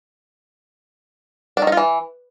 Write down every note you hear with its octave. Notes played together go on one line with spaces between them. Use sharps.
D4
D#3
D#4
F4
E3